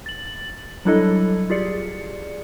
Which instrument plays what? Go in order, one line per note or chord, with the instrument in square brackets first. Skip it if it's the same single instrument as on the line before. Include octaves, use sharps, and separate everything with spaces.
[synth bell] A6 F#7
F#3 G3 D4 E4 A4 D#5
F4 G4 G#4 D5 C#7